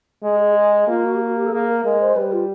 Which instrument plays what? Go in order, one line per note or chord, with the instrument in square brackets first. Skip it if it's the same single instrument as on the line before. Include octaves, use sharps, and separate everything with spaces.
[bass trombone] G#3 [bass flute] G#4
[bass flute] G#4
G#4
[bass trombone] A#3 [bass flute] F4
[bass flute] F#4
G4
F#4
G4
A4
[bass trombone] A#3 [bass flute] G#4
[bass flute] A#4
[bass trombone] G#3 [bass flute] A#4
[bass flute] C5
[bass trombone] G3 [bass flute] B4
[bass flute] F4